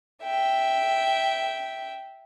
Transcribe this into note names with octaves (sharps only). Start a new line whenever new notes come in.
E5 G5